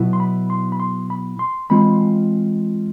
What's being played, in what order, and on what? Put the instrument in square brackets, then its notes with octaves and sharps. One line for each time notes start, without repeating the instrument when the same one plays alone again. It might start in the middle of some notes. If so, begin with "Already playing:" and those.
Already playing: [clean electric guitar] B2 F#3 B3 E4
C6
B5
C6
B5
C6
B5
C6
E3 G#3 C4 F4 B5